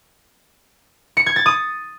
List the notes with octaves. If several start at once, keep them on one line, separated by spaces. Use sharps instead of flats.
C#7
G#6
A6
D#6